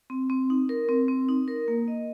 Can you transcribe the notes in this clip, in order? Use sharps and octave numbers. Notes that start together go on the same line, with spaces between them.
C4
C4
D#4
A#4
C4
C4
D#4
A#4
A#3
D#5